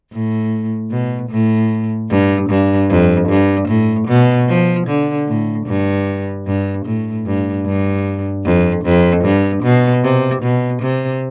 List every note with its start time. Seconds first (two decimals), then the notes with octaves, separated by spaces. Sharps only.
0.12 A2
0.91 B2
1.30 A2
2.10 G2
2.50 G2
2.90 F2
3.29 G2
3.69 A2
4.08 B2
4.49 F3
4.88 D3
5.28 A2
5.67 G2
6.47 G2
6.86 A2
7.26 G2
7.66 G2
8.45 F2
8.85 F2
9.25 G2
9.64 B2
10.04 C3
10.43 B2
10.82 C3